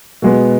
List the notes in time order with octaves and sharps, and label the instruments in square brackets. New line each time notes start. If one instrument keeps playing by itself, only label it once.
[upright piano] B2 G#3 B3